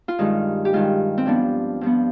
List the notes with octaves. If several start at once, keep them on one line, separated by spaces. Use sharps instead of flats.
F4
G2 D#3 G#3 D#4
G4
G2 D#3 G#3 F4
C4
G2 F3 B3 D4
G2 F3 B3